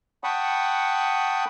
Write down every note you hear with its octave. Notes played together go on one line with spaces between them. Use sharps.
F#5 G5 A5 B5 C#6 D#6